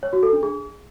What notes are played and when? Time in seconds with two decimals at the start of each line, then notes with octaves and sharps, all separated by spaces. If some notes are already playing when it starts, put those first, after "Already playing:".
0.03 C#5
0.13 F#4
0.23 A4
0.33 D4
0.43 G#4